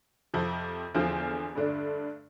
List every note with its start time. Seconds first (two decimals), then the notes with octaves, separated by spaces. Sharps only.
0.34 F2 C3 F3
0.95 E2 D3 F3 C4 F4
1.55 G2 D3 A3 D4